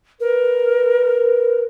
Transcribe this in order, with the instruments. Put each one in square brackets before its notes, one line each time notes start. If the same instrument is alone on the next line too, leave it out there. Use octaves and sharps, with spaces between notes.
[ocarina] A#4 [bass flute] B4